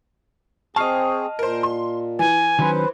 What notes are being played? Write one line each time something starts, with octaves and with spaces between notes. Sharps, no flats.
C4 G#4 D#5 A5 C#6 F6 C7
A#2 A#4 C5
C6
E3 G#5
D#3 F#3 C#4 B4 C5